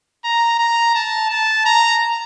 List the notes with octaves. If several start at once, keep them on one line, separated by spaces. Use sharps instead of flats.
A#5
A#5
A5
A5
A#5